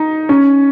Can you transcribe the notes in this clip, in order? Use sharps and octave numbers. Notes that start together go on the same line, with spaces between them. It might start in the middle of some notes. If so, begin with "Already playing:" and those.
Already playing: D#4
C#4